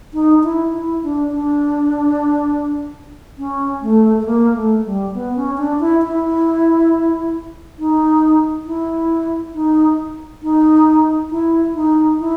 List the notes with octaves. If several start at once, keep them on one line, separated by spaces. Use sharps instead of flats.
D#4
E4
E4
D4
D4
C#4
A3
A3
A#3
A3
G3
B3
C#4
D4
E4
E4
D#4
E4
D#4
D#4
E4
D#4
E4